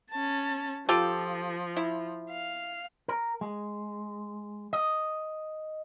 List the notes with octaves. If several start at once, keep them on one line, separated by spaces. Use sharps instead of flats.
C#4 A5
F3 F4 G4 A4
E4
F5
A#4
G#3
D#5